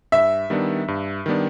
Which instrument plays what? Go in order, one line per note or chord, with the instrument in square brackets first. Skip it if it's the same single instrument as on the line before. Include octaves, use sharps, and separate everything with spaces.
[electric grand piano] G2 [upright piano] E5
[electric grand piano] D#3 G3 B3 D4
G2
D#3 G3 B3 D4